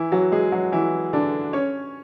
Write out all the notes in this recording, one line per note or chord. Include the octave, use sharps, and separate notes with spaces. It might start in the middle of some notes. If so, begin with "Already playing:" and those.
Already playing: E3 E4
F#3 F#4
G#3 G#4
F#3 F#4
E3 E4
D3 D4
C#4 C#5